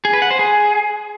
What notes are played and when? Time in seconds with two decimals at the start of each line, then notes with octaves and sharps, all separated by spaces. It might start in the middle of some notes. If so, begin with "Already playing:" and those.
0.05 G#4
0.13 B4
0.22 F#5
0.31 C5
0.39 G#4